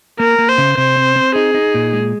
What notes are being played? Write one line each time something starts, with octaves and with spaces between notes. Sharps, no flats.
A#3 A#4
A#3
C5
C#3
C3 C5
C4
C4
D#4 G#4
D#4
A#2
G#3